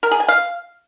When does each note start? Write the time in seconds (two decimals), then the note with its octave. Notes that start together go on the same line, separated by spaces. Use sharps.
0.03 A#4
0.11 G#4
0.20 G#5
0.29 F5